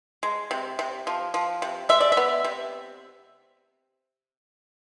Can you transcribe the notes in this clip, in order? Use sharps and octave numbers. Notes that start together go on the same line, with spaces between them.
G#3
C3
C3
F3
F3
C3
G#3 E5
D5
E5
B3
C3